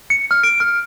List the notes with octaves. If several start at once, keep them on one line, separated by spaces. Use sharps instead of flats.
C#7
F6
D7
F6